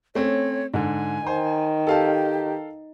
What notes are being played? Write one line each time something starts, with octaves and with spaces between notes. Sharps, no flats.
A3 C4 C#4 C#5
G#2 D3 G#5
D#3 C5
G4 A4 F5 A5